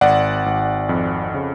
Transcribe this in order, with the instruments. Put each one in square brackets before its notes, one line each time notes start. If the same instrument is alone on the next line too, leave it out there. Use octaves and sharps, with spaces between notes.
[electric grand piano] G#1 D5 F#5
G#1
F2
C#3